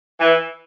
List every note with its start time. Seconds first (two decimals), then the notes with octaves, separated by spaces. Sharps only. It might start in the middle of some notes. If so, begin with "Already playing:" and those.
0.20 E3